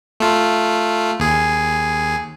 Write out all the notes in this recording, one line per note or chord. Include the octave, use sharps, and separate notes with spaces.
A3 F4
D#2 G#4